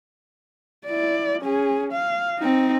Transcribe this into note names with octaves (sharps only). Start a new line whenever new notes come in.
E4 D5
C#4 G#4
F5
C4 D#4